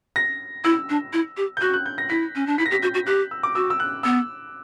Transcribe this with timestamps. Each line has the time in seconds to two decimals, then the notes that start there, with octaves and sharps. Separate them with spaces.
0.16 A#6
0.64 E4 E6
0.89 D4
1.13 E4
1.37 G4
1.57 G6
1.61 F#4 F#6
1.74 F#6
1.86 G6
1.98 A#6
2.10 E4 B6
2.35 C#4
2.47 D4
2.58 E4 B6
2.66 A#6
2.71 G4 B6
2.82 F#4 G6
2.94 F#4
3.06 G4 F#6
3.31 E6
3.43 D6
3.55 F#4 E6
3.70 E6
3.80 F#6
4.03 B3 E6